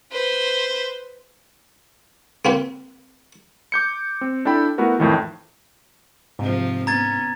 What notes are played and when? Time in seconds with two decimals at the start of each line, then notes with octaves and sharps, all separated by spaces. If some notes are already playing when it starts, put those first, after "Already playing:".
0.12 B4 C5
2.45 A#3 C4 B4
3.72 D6 G6 C#7
4.21 C4
4.45 D4 E4 A4 G5 B5
4.78 A3 B3 E4 F#4 A#4
4.99 F2 A2 D#3 E3
6.39 G#2 C3 F3
6.87 B3 C#4 A#5 G#6 A6